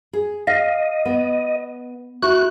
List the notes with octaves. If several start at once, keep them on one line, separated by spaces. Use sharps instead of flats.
G#4
D#5 F5
B3
E4 F#4 F#6